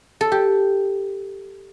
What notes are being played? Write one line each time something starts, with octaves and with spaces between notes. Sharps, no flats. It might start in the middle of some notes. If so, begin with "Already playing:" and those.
A4
G4